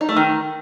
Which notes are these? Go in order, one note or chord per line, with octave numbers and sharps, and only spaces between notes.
D#4
A3
D#3